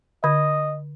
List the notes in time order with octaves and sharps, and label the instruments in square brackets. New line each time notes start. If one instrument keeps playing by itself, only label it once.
[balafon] D3 [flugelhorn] D#5